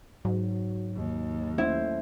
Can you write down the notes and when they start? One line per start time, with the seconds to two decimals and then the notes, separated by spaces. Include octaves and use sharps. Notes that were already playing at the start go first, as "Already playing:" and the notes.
0.25 G#2 F#3
0.96 D#2
1.58 A3 C#4 E4 C5